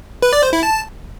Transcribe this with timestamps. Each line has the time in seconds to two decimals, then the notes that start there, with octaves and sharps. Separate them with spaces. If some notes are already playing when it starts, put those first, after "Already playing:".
0.22 B4
0.33 D5
0.43 C5
0.53 E4
0.63 A5